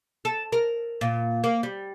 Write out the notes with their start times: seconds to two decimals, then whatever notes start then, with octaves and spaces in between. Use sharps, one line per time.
0.25 A4
0.52 A#4
1.01 A#2
1.44 A#3
1.63 G3